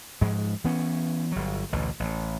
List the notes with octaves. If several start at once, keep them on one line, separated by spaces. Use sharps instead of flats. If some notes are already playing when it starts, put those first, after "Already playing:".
G#2 F3 G#3
E3 B3 C#4
G1 F#3
A1 D2 B2 E3
A1